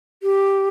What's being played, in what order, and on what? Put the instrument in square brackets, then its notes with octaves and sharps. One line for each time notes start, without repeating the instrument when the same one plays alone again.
[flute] G4